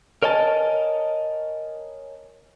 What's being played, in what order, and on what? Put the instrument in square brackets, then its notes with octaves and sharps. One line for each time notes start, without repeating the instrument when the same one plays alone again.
[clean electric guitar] A#4 C#5 D#5 G#5 A5